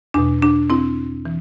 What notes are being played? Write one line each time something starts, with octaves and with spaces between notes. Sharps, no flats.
E2 B2 D4
D4
C4 E4
E3